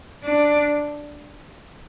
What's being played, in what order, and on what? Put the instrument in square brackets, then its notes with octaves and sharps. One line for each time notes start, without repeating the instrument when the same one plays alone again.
[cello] D4